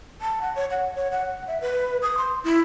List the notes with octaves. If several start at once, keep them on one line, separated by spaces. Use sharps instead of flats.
A5
F#5
C#5
F#5
C#5
F#5
E5
B4
D#6
C6
E4